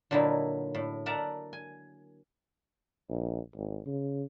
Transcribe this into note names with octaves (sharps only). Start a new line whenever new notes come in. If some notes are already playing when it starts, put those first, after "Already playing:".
A#2 D3 F#3 D#4 E4
A2
A#4 D5 E5 F#5 A5 A#5
G#5
A#1
G#1
C#3